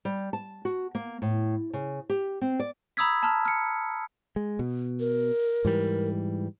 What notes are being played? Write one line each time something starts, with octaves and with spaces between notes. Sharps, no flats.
G3
A5
F#4
A#3
A2
C#3
G4
C4
D5
A#5 B5 D#6 E6 G#6 B6
A5 A#5 F6
F6 C#7
G#3
B2
A#4
G#2 E3 G3